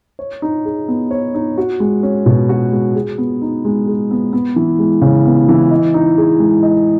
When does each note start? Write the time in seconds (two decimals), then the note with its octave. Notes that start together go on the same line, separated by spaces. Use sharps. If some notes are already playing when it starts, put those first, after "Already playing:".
0.19 C#5
0.42 D#4
0.65 G#4
0.88 B3
1.11 C#5
1.34 D#4
1.58 F#4
1.80 G#3
2.03 C#4
2.26 B2
2.49 F#4
2.72 G#3
2.95 G#4
3.18 B3
3.42 D#4
3.65 G#3
3.87 G#4
4.11 B3
4.33 B3
4.56 E3
4.79 G#3
5.02 C#3
5.26 B3
5.49 E3
5.71 D#5
5.94 D#4
6.18 G#4
6.40 G#3
6.63 D#5